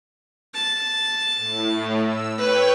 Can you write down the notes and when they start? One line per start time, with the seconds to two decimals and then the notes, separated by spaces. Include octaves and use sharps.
0.54 A5
1.36 A2
2.05 E6
2.38 B4 C#5 G5